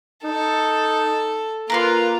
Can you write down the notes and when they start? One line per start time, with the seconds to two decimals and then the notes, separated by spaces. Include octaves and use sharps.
0.24 D#4 A4
1.70 A#3 F4 A#4 B4 C6